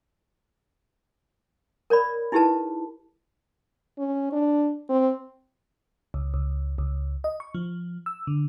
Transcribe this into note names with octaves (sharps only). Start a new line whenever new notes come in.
A#4 C#5 D5 B5
D#4 E4 G4 G#4 B4 A5
C#4
D4
C4
C#2
C#2
C#2
D#5
C#6
F3
E6
D3